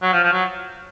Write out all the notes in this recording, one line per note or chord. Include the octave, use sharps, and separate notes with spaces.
F#3
F3
F3
F#3